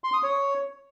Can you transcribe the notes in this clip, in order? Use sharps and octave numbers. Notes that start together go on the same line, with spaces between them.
C6
D#6
C#5